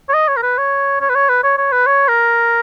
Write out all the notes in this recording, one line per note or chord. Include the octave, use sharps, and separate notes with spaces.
C#5
D#5
C#5
A#4
B4
C#5
C#5
B4
C#5
B4
C#5
C#5
B4
C#5
A#4